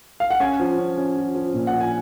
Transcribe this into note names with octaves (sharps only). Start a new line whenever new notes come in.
F5
F#5
C#4 G#5
F3
C#4
C#4
F3
F3
A#2
F#5
F3
G#5